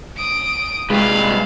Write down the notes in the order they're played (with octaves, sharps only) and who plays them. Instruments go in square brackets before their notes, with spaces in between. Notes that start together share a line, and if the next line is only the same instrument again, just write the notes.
[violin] D#6 D7
[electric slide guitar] C3 G3 B4 [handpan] G#3 [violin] F5